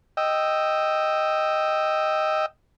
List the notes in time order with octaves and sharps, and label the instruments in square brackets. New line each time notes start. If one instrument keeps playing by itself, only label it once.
[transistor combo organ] D#5 G5 E6